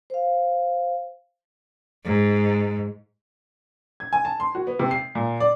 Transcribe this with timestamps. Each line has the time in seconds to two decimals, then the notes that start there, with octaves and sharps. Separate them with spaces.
0.10 C5 F5
2.04 G#2
4.00 G#6
4.13 G#5
4.25 A5
4.40 C6
4.55 F#4
4.67 B3
4.79 C3
4.91 C7
5.15 A#2
5.40 D5